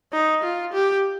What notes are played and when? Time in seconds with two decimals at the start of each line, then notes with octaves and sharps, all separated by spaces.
0.13 D#4
0.43 F4
0.73 G4